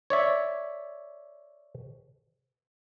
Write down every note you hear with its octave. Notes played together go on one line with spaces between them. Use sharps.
C#5 D5 E5